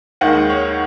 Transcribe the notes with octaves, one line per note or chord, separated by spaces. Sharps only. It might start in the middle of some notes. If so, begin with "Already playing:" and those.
D#2 D#3 G#3 F#5
C#5